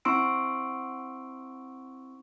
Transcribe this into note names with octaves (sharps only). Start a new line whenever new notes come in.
C4 E4 C6 C#6 E6 D7